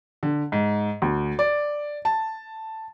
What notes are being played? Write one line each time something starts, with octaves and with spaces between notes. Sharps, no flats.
D3
G#2
D2
D5
A5